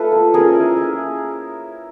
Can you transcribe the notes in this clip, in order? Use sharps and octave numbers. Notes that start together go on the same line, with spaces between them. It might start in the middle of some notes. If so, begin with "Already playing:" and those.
Already playing: A3 F4 A4 B4
A#3
C#4 G#4 A#4
E4
E4